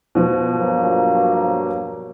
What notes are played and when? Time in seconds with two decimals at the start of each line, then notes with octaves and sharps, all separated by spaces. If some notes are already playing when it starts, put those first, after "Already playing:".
0.15 B2 F3 B3
0.53 G2 F#3 A#3